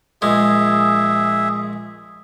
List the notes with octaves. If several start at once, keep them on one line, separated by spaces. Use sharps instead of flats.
A#1 G#3 G#4 E5